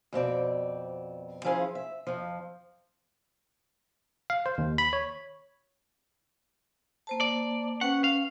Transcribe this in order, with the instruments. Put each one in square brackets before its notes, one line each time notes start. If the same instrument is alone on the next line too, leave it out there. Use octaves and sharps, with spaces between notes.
[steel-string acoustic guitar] F2 B2 C4 D5
F3 C#4 E4 G#4 C5 F5
E5
F2 F3
[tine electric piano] F5
C5
D#2
B5
C#5
[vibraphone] A#3 C5 A5
[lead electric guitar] D5
[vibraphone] C#4 B4 G5 [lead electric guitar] F#5
[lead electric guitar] F5